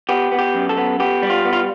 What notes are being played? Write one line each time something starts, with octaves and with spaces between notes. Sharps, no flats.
B3 G4
B3
G4
F#2
A4
B3
B3 G4
G3
F4
B3
F4